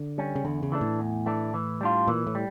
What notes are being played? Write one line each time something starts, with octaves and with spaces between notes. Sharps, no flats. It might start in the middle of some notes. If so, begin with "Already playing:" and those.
Already playing: D3
G3 C#4
C#3
E2 D3
C#3
E3 A3 D4
A2
E2
E3 A3 D4
E3
G3 D4 F4
A#2 E3
A2
G3